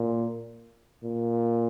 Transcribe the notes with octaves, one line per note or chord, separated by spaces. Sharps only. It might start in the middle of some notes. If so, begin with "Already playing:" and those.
Already playing: A#2
A#2